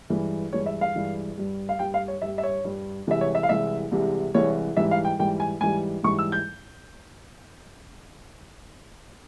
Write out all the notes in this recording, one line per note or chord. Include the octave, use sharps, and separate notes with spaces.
G2 E3 G#3
G2 E3 G#3 C#5
E5
F5
G2 E3 G#3
G2 G3
F5
G2 G3 G5
F5
C#5
G2 G3 E5
E5
C#5
G2 G3
C2 C3 E3 G#3 E5
C#5
E5
F5
C2 C3 E3 G#3 E5
C2 C3 E3 G#3
C2 C3 E3 G#3 C#5
G#2 E3 G3 E5
F5
G5
G#2 E3 G3 G5
G#5
G#2 E3 G3 G#5
G#2 E3 G3 C#6
E6
G6